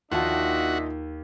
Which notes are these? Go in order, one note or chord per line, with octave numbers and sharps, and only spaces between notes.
D#2 D4 F4 F#4 D#5 E5 F#5 A5